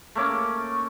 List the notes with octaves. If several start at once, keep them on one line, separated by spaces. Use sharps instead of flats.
A3 A#3 C#4 D6